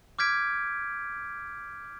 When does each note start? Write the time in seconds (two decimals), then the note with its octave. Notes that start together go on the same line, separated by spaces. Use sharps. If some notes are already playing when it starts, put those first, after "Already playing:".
0.19 D6 F6 G6 G#6 B6 D7